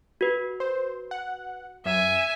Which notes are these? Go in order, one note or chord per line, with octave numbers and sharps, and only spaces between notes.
F#4 B4
C5
F#5
F#2 E5 G#5